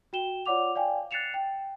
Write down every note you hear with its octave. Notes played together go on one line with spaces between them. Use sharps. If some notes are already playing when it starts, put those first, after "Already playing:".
F#4 G5 E7 G7
F4 C#5 D5 F#5 D6 F7
D5 F5 G5 G#5
F#6 A6 C7 C#7 E7 F7
G5